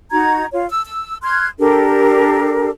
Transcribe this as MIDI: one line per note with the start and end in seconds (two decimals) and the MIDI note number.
0.12 0.45 63
0.12 0.45 66
0.12 0.45 82
0.12 0.45 92
0.52 0.65 65
0.52 0.65 73
0.70 0.85 88
0.85 1.17 88
1.23 1.48 84
1.23 1.48 89
1.23 1.48 90
1.23 1.48 92
1.59 2.70 62
1.59 2.70 67
1.59 2.70 69
1.59 2.70 70